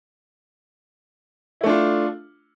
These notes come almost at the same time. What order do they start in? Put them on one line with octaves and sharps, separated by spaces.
E4 A3 D4 F4